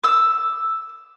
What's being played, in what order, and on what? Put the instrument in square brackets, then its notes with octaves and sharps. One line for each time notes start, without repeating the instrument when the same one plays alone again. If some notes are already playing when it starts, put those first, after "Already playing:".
[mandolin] D6 E6